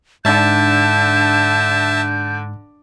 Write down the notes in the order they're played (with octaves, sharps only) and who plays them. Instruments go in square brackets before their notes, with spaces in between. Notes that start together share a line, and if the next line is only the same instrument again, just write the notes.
[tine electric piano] G#2 D4 [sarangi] D3 [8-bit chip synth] E5 A5 [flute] G6